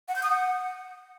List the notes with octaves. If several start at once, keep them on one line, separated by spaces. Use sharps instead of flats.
F#5
G6
D#6
F#5